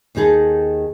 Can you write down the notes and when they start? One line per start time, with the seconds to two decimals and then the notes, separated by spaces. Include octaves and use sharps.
0.15 D#2 D#3 D#4 G#4 A4